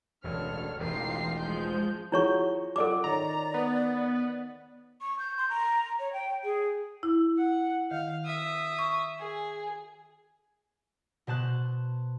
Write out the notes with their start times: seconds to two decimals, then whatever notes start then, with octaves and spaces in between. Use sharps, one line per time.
0.24 E1 A1 D2 D4 A4 C#5 F6
0.79 E1 A1 E3 D#4 F4 G4 C7
1.40 F3 G#3 G6
2.12 F3 E4 F#4 G#4 C#5 C#6
2.76 F4 A4 D5 F#5 D6
3.04 D#3 C#5 D5 A#5
3.54 B3
5.01 C#6
5.19 G6
5.38 C6
5.50 A#5
6.00 C#5
6.13 G5
6.44 G#4
7.03 E4
7.38 F#5
7.91 D#3 F5
8.25 E5 D#6
8.79 C#6
9.19 G#4
11.27 B2 C5 A5 F#6